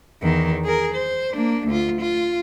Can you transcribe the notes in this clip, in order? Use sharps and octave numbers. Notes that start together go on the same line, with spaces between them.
E2 D#3
G#4 A#4
C5
A#3 D4
D2 F4
F4